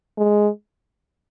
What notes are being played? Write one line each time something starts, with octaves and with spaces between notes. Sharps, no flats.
G#3